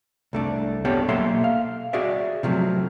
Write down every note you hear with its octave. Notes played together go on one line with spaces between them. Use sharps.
C2 A3 D4
B3 G4 A4 C#5 D5
B1 A#3 A4 E5 C6
F5
F#4 G#4 D5 E5
C3 F3 F#3 A3